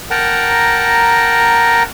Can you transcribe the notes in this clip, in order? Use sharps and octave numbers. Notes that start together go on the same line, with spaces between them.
A#4 F#5 G5 A5 A#5